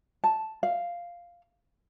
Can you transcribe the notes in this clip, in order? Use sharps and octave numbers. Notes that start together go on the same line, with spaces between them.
A5
F5